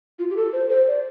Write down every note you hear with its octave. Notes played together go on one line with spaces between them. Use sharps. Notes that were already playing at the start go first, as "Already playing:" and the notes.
F4
G4
A4
C5
C5
D5